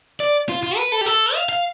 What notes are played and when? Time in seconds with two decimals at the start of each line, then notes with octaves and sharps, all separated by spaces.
0.20 D5
0.49 F4
0.63 F4
0.77 B4
0.92 A4
1.01 G4
1.06 A4
1.35 F5
1.49 F5